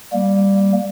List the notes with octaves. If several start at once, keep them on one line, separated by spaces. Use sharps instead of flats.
G3 A#3